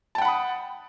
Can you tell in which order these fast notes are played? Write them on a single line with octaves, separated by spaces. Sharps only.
A5 G5 F#5 B5 D#6